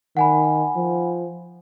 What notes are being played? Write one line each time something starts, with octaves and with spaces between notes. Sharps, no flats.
D#3 F#5 G#5 B5
F3